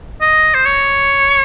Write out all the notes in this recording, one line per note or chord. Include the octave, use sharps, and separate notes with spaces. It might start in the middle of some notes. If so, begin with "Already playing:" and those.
D#5
C5
C#5